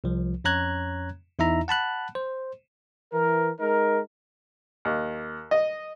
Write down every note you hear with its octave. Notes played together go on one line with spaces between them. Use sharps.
C2 F3
F2 C#4 C#5 A#5 F#6 G#6
E2 D#4 E4 E5 A#5
F#5 A5 B5 F#6
C5
E3 A#4
G#3 D#4 A#4
D#2
D#5